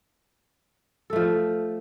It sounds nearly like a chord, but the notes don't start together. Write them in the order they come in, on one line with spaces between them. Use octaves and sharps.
A4 A3 F3